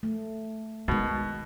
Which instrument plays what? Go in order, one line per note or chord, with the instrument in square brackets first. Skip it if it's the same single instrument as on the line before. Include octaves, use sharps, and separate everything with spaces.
[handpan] A3
[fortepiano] B2 [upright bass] D#3 G#3